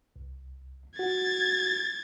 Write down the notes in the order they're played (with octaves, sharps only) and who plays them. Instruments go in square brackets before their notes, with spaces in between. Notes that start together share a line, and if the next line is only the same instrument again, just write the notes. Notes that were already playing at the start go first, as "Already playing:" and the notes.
[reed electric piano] C2
[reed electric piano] F#4 [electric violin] G#6 A6